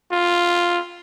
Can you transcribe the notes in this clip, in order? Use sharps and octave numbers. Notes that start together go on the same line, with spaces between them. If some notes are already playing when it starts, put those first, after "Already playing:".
F4